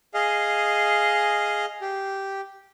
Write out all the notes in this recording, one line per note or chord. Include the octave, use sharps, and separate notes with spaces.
G#4 D#5 F5
G4